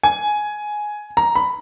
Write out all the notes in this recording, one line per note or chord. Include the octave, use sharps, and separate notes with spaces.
G#5
A#5
B5